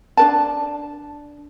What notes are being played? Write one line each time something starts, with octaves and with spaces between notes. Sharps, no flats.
D4 A#4 A5